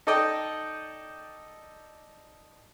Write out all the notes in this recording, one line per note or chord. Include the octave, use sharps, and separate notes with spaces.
D#4 A4 D5 D#5 G5